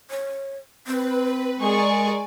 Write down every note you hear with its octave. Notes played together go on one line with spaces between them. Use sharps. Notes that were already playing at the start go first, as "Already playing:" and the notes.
C#5
C4 B4
G#3 G#4 A#4 D5 G#5 C#6